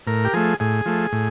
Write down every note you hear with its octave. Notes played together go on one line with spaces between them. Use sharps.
A2 A#4
G4
F3 A3 G#4
A2 G#4
F3 A3
A2